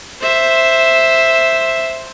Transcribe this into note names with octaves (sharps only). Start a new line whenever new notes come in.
C5 E5